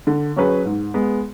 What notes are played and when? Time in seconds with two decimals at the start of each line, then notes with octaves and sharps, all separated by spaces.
0.07 D3
0.36 F#3 C#4 G#4 B4
0.66 G#2
0.94 G#3 B3